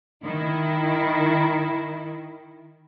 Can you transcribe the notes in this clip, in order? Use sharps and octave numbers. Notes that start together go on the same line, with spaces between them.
D#3 E4